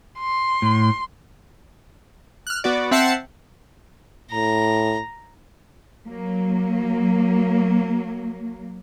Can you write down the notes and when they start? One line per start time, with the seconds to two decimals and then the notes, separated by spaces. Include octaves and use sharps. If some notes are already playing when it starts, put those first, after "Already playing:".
0.20 C6
0.62 A2
2.47 F6 F#6
2.64 B3 F#4 D5
2.91 C4 E5 F#5 A5 C7 C#7
4.31 A2 A#5
6.05 F#3 A#3